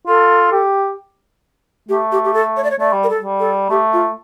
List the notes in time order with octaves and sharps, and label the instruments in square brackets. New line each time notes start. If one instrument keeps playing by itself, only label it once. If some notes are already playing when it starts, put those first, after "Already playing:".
[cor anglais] F4 [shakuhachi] A4
[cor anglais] G4
[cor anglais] A3 [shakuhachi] G4
[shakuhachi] G4
G4
A4
C#5
D5
C#5
[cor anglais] A3 [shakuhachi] D5
[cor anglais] G3
[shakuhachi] A#4
A4
[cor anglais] G3
[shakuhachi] A4
[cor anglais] A3 [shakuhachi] G4
[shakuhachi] F4